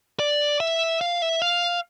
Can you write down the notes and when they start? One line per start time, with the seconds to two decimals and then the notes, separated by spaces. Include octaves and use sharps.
0.19 D5
0.60 E5
1.01 F5
1.22 E5
1.42 F5